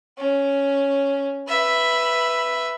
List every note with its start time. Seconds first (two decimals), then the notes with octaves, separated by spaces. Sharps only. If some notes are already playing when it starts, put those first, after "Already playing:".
0.18 C#4
1.48 B4 E5